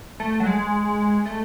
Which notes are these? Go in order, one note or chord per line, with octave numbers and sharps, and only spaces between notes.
A3
F#3
G#3
A3